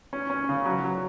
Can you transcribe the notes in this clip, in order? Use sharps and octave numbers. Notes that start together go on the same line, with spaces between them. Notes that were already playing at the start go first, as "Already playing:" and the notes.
C#4
C#4
C#3
F#3
F#3